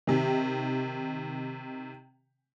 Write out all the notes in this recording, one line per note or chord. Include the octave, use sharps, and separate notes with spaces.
C3 D#3